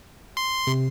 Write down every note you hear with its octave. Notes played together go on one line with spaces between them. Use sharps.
C6
C3